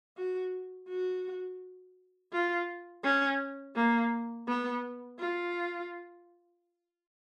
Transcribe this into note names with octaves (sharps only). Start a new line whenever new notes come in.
F#4
F#4
F4
C#4
A#3
B3
F4